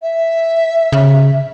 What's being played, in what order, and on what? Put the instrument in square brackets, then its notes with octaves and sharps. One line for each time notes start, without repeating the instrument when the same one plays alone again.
[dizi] E5
[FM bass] C#3